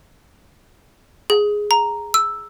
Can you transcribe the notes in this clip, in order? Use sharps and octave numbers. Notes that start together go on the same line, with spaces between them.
G#4
A#5
E6